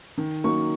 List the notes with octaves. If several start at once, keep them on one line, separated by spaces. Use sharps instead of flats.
D#3
F#3 A#3 D#4 C#6